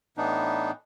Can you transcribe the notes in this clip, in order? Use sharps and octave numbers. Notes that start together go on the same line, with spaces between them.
A2 E3 B3 D4 D#4